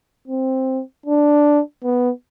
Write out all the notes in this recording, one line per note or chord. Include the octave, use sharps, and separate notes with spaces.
C4
D4
B3